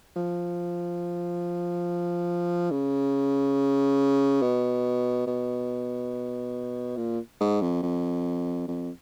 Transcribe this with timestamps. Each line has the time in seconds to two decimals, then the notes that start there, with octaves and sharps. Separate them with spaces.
0.16 F3
2.71 C#3
4.42 B2
5.27 B2
6.97 A#2
7.41 G#2
7.62 F2
7.83 F2
8.68 F2